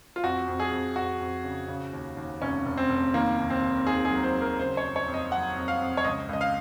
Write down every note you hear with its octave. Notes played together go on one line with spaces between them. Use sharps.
F4
F2 F#4
F2
G#4
F2
F2 F#4
F2
C#3
C#3
D#2
D#2
F1 C#4
F1
C4
F1
D#3 A#3
D#2
C4
D#2
D#2 G#4
G#4
F#3
C5
F#3
A#4
C#3 C5
C#5
F2
C#5
F2
D#5
F#3 F#5
F2
F5
F2
C#5
C#2 D#5
C#2 D#5
F5